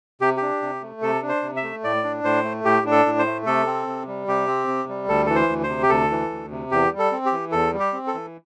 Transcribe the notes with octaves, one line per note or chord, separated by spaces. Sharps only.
C3 G4
D4 G4
C3
A3
C3 A4
D4
C5
C3
E5
A3
A2 D5
D4
A2 C5
A3
A2 G4
D4
A4
A2
C5
A3
C3 A4
C4
C3
G3
C3 G4
C4
C3
G3
D2 A4
E3 A4
C5
D2
C5
C3
G4
D2 A4
E3
D2
C3
E2 G4
G3
A4
C4
G4
E3
E2 A4
G3
G4
C4
A4
E3